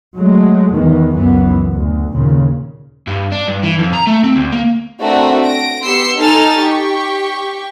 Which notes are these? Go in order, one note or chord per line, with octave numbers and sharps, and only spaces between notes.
F#3 G#3 A3
E2 D#3 E3
C#2 F#2 E3 B3
D2
D#2 A#2 C#3
G2
D4
G2
E3
F2
A#5
A3
C4
D2
A#3
A3 C4 D4 F#4 A4 A#4
A#6 D7
B3 G4 C6 E6 C7 C#7
D#4 A4 D#5 G#5 F6 A6
G4 C#6